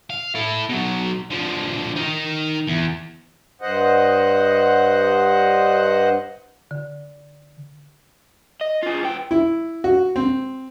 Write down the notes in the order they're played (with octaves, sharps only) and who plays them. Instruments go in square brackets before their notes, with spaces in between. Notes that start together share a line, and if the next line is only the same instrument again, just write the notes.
[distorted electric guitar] F5
E4 A4
B2 F#3
D3 F3
D#4 A#4
E2
[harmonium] G2 C5 D#5 F#5
[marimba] D3
[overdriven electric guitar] D#5
F4 G#4
B3 G5
[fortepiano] E4
F#4
C4